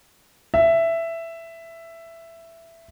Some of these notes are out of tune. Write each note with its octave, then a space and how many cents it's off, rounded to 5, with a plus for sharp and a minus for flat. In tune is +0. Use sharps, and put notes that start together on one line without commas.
E5 +10